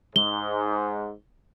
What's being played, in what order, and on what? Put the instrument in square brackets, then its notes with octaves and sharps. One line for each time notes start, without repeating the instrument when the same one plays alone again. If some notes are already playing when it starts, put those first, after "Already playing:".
[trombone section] G#2 [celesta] G7